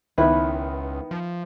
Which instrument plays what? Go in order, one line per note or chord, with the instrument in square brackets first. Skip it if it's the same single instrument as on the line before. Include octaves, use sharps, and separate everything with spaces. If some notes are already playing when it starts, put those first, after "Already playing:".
[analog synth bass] C#2 [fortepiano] D#3 B3 [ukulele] E4 B4
[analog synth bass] F3